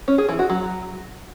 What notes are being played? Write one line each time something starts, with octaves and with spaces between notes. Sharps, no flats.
C#4
G#4
E3
F#4
F#3